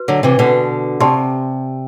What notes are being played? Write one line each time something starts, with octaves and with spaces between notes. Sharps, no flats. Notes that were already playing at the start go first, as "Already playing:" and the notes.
Already playing: F#4 B4
D3 F#3
C3 E3
B2 D3
C3 G4 D5 A5 C6